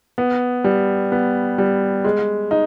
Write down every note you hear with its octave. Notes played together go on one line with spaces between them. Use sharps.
B3
G3
B3
G3
G#3
D#4